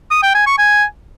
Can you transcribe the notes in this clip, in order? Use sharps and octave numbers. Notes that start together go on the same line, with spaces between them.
D#6
G5
G#5
C#6
G#5